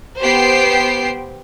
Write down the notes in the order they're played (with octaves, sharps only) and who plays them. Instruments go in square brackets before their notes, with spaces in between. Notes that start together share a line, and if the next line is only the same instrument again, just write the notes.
[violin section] B3 G4 C5 G5 C7